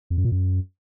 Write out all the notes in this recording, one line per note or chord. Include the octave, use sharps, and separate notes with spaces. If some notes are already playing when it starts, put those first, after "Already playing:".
F2
F#2
A#2
F#2